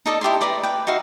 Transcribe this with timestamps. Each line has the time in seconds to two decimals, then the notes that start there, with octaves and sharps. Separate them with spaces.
0.06 D#4 A4 D5 D#5
0.21 E4 G4 E5 C6
0.41 B4 D5 A#5 B5
0.63 B4 G5
0.87 D#4 F#4 E5 F5